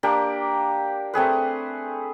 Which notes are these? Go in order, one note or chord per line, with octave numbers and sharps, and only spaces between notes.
A#3 D4 G4
A3 C4 G#4 B4